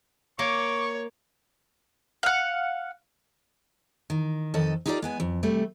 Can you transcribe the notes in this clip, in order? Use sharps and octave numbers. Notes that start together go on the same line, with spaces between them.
A#3 C#5 C#6 D6
F5 F#5
D#3
F2 D#3 A4 D#5
D#4 F4 G4 A4 A#4 D5
G#3 B3 G#5
F2
C3 G3 A3